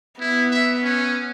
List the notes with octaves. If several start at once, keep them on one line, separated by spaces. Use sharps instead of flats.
B3 E4
E5
C#4